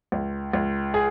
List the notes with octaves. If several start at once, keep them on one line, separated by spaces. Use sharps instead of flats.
C#2
C#2
G#4